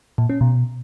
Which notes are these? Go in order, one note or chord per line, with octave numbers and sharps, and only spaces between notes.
A#2
C#4
B2